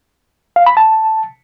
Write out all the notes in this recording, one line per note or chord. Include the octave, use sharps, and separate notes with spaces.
F5
B5
A5